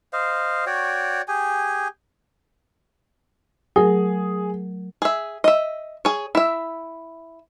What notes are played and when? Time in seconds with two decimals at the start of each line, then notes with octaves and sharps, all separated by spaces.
0.13 C5 D#5 F5
0.67 F#4 C#5 D5 G5
1.28 G4 G#4 G#5
3.76 F#3 A3 G#4 A#4
5.02 G#4 E5
5.44 D#5 E5
6.05 G#4 C#5
6.35 E4 E5